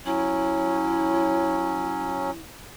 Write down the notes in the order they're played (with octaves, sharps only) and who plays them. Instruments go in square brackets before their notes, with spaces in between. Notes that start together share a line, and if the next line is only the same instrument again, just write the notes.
[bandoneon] F#3 C#4 [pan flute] E4